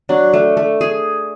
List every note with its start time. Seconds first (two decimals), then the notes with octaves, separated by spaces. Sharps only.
0.09 F#3 D4
0.34 A3
0.57 A3
0.81 G#4